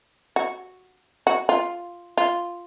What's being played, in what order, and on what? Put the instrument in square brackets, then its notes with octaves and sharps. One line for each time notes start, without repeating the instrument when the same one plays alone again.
[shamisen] F#4
F#4
F4
F4